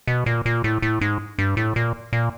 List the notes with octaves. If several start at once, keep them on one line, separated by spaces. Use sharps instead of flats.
B2
A#2
A#2
A2
A2
G#2
G2
A2
A#2
A#2